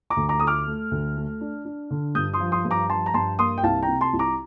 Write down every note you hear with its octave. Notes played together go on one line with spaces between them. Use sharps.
A#5 D6
D2
A#5 D6
A3 D#6
D6 F6
A3
D2
A3
D4
D4
D3
G2 D#6 G6
C6 D#6
F3
C6 D#6
G2
A#5 D6
F3 A5 C6
A#5
G2 A5 C6
A#3 C6 D#6
G5
C2 F5 A5
G5 A#5
C3
A5 C6
C2
A#5 D6